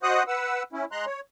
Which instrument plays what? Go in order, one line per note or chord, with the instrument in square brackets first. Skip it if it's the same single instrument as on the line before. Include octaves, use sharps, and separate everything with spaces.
[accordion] F#4 C5 D#5 F#5 D#6 F#6
B4 F#5 E6
C#4 E4
G#3 A#5 C6 F#6
C#5